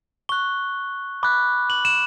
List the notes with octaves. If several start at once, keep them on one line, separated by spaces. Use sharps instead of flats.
C#6 F#6 G7
B5 D6 F#6
F#7
E7